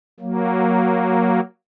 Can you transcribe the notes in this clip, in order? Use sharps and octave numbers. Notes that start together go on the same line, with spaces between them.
F#3 A#3